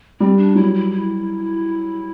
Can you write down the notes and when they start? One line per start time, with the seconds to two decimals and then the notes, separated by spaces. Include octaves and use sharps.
0.20 G3 C4
0.37 D4
0.55 F#3 E4
0.74 E4
0.91 E4